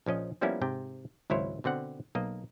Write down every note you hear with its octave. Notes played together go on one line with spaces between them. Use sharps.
A#1 F3 C#4 D#5
F3 G3 A#3 B3 C#4 E4
G#2 C3 G5
G#1 C#2 F#3 E4 C5 C#5
B2 D3 C4 F#5
B1 A#3 D#5